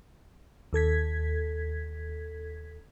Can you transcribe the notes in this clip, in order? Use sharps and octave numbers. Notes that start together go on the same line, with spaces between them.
D#2 A4 G#6 B6